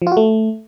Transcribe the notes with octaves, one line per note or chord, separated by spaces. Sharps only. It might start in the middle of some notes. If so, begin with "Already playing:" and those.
F3
F4
F#4
A3